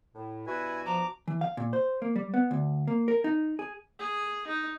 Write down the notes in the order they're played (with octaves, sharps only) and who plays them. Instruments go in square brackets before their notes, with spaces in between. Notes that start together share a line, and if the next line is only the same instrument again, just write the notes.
[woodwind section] A2
[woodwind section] G2 B2 F#4 [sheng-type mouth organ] E4 G#5 [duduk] B4
[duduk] F3 [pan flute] A#5 [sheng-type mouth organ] D6
[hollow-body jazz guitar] E3
F5
A#2
C5
A#3
G3
B3
D2
A#3
A#4
D#4
G#4
[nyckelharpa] G#4
D#4